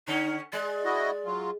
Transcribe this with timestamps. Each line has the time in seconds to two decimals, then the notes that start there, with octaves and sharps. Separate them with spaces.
0.08 D3 C#4 D#4
0.53 G#3 D5
0.85 E4 F#4 D#5
1.26 F#3 F4